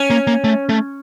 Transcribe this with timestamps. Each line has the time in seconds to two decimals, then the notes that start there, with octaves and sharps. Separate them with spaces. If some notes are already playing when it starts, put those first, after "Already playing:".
Already playing: C#4
0.10 A#3
0.27 A#3
0.44 A3
0.69 A3